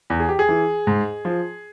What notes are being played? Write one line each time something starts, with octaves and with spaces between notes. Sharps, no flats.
E2
G#4
G4
G#4
E3
G#2
F3